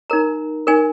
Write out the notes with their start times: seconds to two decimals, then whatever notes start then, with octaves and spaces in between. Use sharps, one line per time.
0.10 D#4 A#4 A#5
0.67 D#4 A#4 G#5